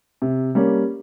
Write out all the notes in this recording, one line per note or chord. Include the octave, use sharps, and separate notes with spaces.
C3
G3 A#3 C#4